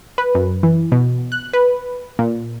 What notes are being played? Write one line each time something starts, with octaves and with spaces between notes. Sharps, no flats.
B4
F#2
E3
B2
F#6
B4
A#2